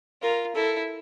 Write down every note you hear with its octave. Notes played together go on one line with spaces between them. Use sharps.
F4 A#4
E4 A4